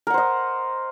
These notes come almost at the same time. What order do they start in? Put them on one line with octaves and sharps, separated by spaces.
A#4 F#5 C5 D#5